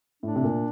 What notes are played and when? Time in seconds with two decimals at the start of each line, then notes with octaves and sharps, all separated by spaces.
0.23 A2 D4
0.36 C3
0.44 A#2